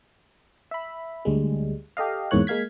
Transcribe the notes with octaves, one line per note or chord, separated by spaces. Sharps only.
E5 B5
D2 G3 G#3
G4 A4 D#5 F5
E2 G#2 E3 A#3 C#5 F#6
G#3 A#3 F5 G#6 B6